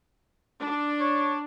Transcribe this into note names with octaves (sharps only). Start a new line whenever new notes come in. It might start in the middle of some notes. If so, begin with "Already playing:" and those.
D4
C#5